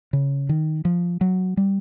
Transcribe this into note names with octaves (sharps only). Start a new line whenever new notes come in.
C#3
D#3
F3
F#3
G3